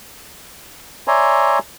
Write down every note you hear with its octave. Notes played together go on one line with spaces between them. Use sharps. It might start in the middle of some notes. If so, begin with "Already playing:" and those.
C#5 D5 E5 G#5 A#5 C6